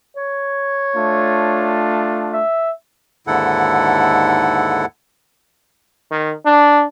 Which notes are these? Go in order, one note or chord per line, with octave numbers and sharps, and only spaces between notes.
C#5
A3 D4 F4
E5
D#2 G#2 D3 E4 A4 F#5
D#3
D4